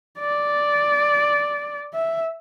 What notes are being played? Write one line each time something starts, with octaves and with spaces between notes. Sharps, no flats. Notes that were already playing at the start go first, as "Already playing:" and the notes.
D5
E5